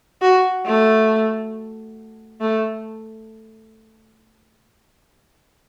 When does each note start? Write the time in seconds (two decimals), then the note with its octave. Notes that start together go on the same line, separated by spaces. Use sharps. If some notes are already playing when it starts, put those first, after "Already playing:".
0.22 F#4
0.66 A3
2.40 A3